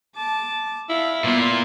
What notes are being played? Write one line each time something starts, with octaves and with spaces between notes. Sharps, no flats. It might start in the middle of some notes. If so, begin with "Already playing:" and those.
A5 D6
E4 F5
A#2 B3 F4